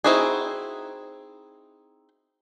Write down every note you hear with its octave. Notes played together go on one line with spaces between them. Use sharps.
C4 D#4 E4 F#4 G#4